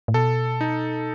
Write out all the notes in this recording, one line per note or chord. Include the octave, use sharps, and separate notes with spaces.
A2
B2 A4
D#4